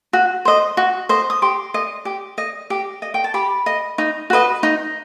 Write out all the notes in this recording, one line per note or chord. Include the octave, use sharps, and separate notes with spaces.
F#4
C5 D#5
F#4
C5 D#5
D#6
G4 C6
D#5
G4
D#5
G4
D#5
G5
A5
G4 B5
D#5
D#4
F#4 B4 D#5
D#4